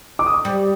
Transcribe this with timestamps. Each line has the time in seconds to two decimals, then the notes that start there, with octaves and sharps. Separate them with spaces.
0.19 D6
0.26 D#6
0.34 D6
0.45 G3